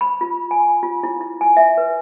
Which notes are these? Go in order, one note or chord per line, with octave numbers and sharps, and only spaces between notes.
B5
F4
G#5
F4
E4
E4
G#5
E5
B4